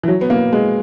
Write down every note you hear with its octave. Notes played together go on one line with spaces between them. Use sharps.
E3
F#3
B3
A#3
G#3